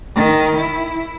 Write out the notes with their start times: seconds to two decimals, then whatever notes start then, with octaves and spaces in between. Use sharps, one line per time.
0.15 D#3
0.58 E4